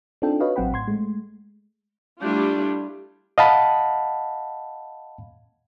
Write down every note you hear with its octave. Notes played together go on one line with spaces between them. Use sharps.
C4 D4 D#4 F4 A4 G5
F#4 B4 C#5 D#5 F5
A1 F#3 C4 F#5 G5 B5
A2 C6 G#6
G#3 A3
G3 A3 D4 E4 F4
D#5 F5 F#5 A5 B5